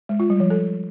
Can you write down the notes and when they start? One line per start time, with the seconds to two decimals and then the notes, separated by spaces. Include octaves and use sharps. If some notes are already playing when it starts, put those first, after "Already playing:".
0.09 G#3
0.20 F4
0.30 G3
0.40 F3
0.50 A4